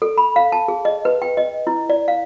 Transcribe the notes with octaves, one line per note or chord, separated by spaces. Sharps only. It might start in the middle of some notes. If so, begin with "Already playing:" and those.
A4
B5
F5
A5
G#4
D#5
B4
G5
D#5
E4
D5
F5